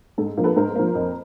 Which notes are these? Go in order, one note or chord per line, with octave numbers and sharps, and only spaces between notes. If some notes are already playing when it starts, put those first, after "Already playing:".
G#2 A4
F3 A#3
A4 B4
G#2 A#4 C5
F3 A#3
F2